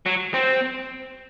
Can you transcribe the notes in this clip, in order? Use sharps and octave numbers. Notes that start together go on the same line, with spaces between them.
F#3
C4